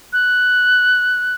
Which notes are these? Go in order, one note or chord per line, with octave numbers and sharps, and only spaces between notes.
F#6